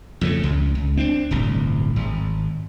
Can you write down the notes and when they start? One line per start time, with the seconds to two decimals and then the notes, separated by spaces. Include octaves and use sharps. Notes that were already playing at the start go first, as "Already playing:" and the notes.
0.21 F2 C#3 A3
0.43 C#2
0.75 C#2
0.97 C4 D4
1.31 D1 G1 C2
1.96 G#1